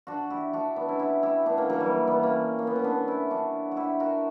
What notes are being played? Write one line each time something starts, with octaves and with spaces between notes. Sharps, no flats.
D4 F#4
E4 G4
D4 F#4
B3 D4
C#4 E4
E4 G4
E4 G4
B3 D4
A#3 C#4
F#3 A#3
E3 G3
G3 B3
A#3 C#4
A#3
B3
C#4
B3 D4
C#4 E4
D4 F#4
F#4
E4 G4
F#4 A#4